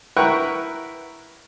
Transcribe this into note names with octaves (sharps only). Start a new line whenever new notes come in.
E4 A#4 B4 F#5 G5 C#6